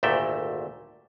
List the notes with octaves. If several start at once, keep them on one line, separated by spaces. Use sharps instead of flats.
G#1 D2 A#2 A3 E5 G5